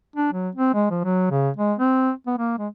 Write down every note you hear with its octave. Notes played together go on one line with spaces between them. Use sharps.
D4
F#3
C4
G#3
F3
F#3
C#3
G#3
C4
B3
A#3
G#3